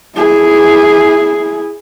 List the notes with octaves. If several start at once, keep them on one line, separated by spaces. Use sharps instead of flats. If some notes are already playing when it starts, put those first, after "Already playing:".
E4 G#4